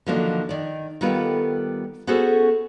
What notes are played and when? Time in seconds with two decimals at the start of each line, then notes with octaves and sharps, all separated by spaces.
0.06 D3 D#3 F3 F#3 A#3 D4
0.49 D#3 D5
1.01 D#3 G3 B3 F4 A4
2.07 B3 C#4 F#4 G#4 A4 C5